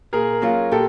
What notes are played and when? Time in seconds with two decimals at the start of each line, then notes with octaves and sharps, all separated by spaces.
0.13 A#2 G#4 A#4
0.42 F#3 A#3 C#4 F4
0.71 A#2 G4 A4